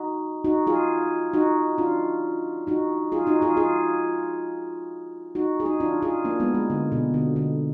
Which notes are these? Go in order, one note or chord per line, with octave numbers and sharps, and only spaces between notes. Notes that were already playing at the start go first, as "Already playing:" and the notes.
Already playing: D#4 F#4
D#4 F#4
F4 G#4
D#4 F#4
D4 F4
D#4 F#4
F4 G#4
D#4 F#4
F4 G#4
F4 G#4
D#4 F#4
G#4
D#4 F#4
D4 F4
F4 G#4
A#3 D4
G#3 B3
G#3
D3
B2
D3
D3